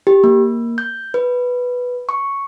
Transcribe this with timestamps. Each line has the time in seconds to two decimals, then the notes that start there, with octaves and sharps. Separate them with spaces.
0.07 G4
0.24 A#3
0.78 G6
1.14 B4
2.09 C#6